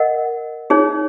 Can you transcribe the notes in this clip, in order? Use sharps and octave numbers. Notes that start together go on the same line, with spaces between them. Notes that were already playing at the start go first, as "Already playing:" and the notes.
Already playing: A#4 D#5 F#5
D#4 G#4 C#5